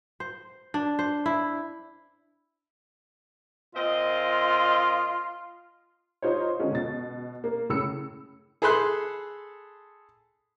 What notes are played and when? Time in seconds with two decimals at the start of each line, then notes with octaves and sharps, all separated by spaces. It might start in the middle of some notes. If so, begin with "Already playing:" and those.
0.20 C5
0.74 D4
0.99 C5
1.26 E4
3.75 A#2 C4 F4 D#5
6.22 D#4 F4 C5 C#5
6.59 D3 G#3 C#4 F4
6.72 B2 A6
7.44 A#3
7.70 A2 C#3 E6 C#7
8.62 G#4 A4 A5 B5 C6 F#6